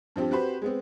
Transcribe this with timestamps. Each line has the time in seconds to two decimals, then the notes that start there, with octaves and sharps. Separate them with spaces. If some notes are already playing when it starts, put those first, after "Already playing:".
0.16 G2 F3 C4 G4
0.31 C4 F#4 G4 B4 C5
0.62 G#3 B3 C4